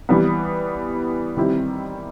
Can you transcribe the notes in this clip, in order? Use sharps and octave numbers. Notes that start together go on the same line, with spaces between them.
E3 G3 B3
D#3 G3 C4 E4